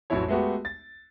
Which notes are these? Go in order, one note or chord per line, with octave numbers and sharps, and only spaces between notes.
A1 F2 F#3 A3 E4 C#5
G#3 A3 B3 F#4 G4
A6